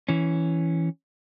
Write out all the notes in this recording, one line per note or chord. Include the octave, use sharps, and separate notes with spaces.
E3 C#4